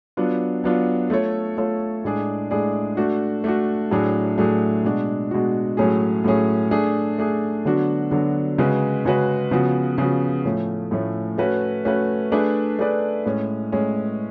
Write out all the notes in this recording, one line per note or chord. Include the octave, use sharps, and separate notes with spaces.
F#3 B3 D4 F4
F#3 B3 D4 F4
A3 F4 A4 C#5
A3 F4 A4 C#5
A2 G#3 D4 G#4 D5
A2 G#3 D4 G#4 D5
A3 D4 F#4
A3 D4 F#4
A2 F#3 A3 D4 G#4
A2 F#3 A3 D4 G#4
B2 G#3 D4 F#4
B2 G#3 D4 F#4
A2 F#3 A3 C#4 G#4
A2 F#3 A3 C#4 G#4
A3 D4 G#4
A3 D4 G#4
D3 F#3 B3 D4 F#4
D3 F#3 B3 D4 F#4
C#3 G#3 C#4 F#4 B4
C#3 G#3 C#4 F#4 B4
C#3 F3 B3 F#4
C#3 F3 B3 F#4
A2 F3 A3 C#4
A2 F3 A3 C#4
A3 C#4 F#4 B4
A3 C#4 F#4 B4
A3 D4 G#4 B4 D5
A3 D4 G#4 B4 D5
A2 G#3 C#4
A2 G#3 C#4